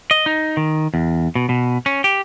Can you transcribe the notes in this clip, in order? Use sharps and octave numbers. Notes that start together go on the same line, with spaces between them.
D#5
D#4
D#3
E2
B2
B2
C#4
G4